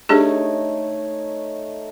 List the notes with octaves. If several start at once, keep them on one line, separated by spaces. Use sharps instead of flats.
A3 D4 D#4 G4 G#4 C#5